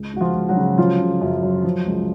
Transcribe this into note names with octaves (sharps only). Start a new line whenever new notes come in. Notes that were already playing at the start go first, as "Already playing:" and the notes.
Already playing: C#2
C#2 F#4
F3 F4
C#2
F#3 F#4
C#3
F3 F#3 F4
C#3
F#2
F#3
F3
C#2